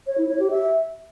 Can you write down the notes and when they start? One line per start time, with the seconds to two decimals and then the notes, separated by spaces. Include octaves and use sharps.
0.07 C#5
0.18 E4
0.29 C#5
0.40 G4
0.51 E5